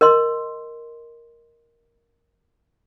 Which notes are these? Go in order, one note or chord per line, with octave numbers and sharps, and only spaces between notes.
A#4 D#5 C6